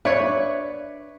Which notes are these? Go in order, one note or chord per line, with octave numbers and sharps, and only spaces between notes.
D4 B4 C#5 D5 E5